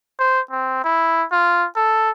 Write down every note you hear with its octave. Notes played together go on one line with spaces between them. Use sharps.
C5
C4
E4
F4
A4